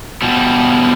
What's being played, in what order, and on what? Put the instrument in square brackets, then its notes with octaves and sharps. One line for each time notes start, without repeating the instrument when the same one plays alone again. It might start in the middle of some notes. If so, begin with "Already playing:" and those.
[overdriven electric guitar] B2 G3